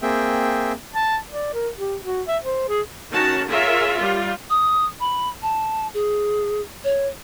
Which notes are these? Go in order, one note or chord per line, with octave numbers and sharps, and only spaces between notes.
A#3 C4 G#4 E5 G5
A5
D5
A#4
G4
F#4
E5
C5
G#4
D#3 C#4 F#4 A5
F4 G#4 A#4 C#5 E5
G3 F4
D#6
B5
A5
G#4
C#5